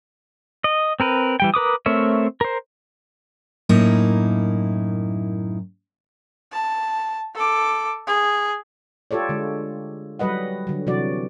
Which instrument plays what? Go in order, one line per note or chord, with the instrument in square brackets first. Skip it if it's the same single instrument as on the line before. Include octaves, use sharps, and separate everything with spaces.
[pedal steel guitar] D#5
C4 A#4 B4
E3 G3 G5
A#4 B4 D6 D#6
A3 C4 A#4 C#5 E5
A#4 C5
[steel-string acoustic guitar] F#2 A2 A#3 D#4 E4
[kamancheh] A5
A4 D6
G#4
[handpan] F4 G4 A4 C#5 D5
D3 G#3
F#3 G3 B4 D#5 F#5
D3 F#3
C3 E3 F#3 F#4 D5